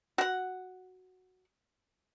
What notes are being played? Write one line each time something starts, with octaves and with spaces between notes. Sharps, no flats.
F#4 F#5